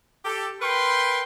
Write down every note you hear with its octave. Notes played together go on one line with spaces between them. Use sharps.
G4 A4
A#4 B4 G5 B5 C6